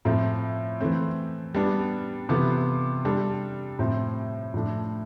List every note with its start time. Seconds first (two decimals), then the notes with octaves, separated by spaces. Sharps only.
0.05 A2 F3 A3 C4 F4
0.81 E3 A3 C4
1.54 G3 B3 D4
2.29 C3 E3 B3 F4 A4
3.05 G3 D4 A4
3.79 A2 F3 C4
4.54 A2 F3 A3 D4